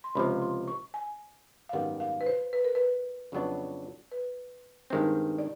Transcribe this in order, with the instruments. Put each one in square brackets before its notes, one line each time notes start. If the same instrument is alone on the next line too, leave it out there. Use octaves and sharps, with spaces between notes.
[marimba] C6
[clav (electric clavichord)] C#2 C3 F3 [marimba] B5
[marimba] C6
C#6
G#5
F5
[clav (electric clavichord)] G#1 F#2 D#3 G3 B3 [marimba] F#5
[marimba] F5
B4
C5
B4
A#4
B4
[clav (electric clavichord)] F2 C#3 F#3 B3 D4
[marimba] B4
[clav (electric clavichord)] G2 D#3 G#3 C4
[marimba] D5